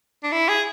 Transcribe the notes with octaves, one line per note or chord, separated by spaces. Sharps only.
D4
E4
G#4